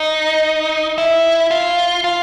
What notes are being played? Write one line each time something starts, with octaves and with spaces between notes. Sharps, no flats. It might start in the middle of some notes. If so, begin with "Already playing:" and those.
Already playing: D#4
E4
F4
F4